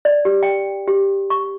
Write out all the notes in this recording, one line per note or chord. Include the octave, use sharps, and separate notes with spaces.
D5
G4
G5
G4
C#6